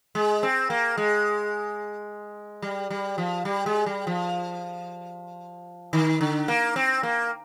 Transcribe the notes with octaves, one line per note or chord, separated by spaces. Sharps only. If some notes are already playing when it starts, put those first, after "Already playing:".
G#3
C4
A#3
G#3
G3
G3
F3
G3
G#3
G3
F3
D#3
D3
A#3
C4
A#3